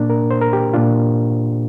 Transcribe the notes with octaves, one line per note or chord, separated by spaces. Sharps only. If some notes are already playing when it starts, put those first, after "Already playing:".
Already playing: A#2 A#3 D4
A#4
C5
A#4
G4
A#2 A#3 D4 F4